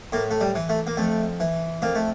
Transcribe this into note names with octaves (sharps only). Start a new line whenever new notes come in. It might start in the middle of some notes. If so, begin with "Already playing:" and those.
A2 A#3
A3
G3
E3
A3
A#3
F2 A3
E3
F2 A#3
A3